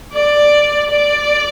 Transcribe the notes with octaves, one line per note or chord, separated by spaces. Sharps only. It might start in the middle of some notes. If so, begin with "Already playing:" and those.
D5
D5